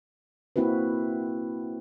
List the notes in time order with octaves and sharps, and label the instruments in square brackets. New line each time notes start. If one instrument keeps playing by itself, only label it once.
[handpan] A#3 C4 E4 F#4 B4